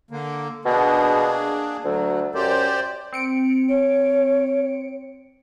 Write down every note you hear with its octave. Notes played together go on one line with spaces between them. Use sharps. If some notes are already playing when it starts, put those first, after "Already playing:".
D3 A#3
B2 A#3 D4 G#4
D2 F#3
F#2 G4 C5 D5
C4 C#7 D7
C#5